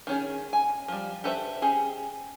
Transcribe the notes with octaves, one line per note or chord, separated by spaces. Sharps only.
D#3 C#4 G#4
G#5
F3 G3
G4 A4 B4 C5 E5
C#4 G4 G#4